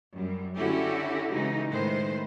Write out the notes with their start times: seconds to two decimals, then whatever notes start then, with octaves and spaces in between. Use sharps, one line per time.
0.15 F#2 G3
0.57 D3 C#4 E4 F#4 G4 A4
1.32 C#3 E3 G#3 D#4
1.70 A2 D#3 G#3 B4 C5